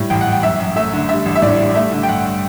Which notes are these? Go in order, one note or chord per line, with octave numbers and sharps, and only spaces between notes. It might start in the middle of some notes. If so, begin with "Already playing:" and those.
Already playing: A2 G3
A1 G5
F#5
A1
G5
F#2 E5
F#2
A3 E5
D3
G3 E5
A1
E5
A2 D5
G3
A3 E5
D3
G5
G2 F#5